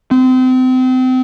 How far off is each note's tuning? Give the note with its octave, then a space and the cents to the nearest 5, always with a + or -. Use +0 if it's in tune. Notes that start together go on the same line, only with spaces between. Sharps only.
C4 -30